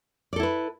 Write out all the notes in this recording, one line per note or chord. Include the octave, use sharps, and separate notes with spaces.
E4 A4 B4 D5